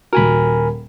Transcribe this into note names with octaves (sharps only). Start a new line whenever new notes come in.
D#1 F#4 A#4 G#5 B5